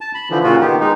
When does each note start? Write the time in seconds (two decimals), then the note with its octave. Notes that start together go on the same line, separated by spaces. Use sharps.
0.01 A5
0.15 B5
0.30 D3 E3 F3
0.44 A#2 C#3 F4 F#4
0.61 D#3 B3 G4
0.80 G#3 D#4